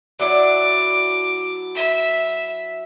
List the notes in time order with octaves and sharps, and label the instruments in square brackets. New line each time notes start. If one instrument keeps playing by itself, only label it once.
[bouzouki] F#3 D4 E4 [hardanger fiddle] D6
[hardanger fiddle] E5